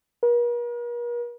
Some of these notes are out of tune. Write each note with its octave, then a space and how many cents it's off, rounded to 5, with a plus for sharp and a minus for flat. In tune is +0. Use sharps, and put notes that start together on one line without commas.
A#4 +45